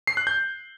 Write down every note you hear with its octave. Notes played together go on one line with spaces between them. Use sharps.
C7
F#6
G6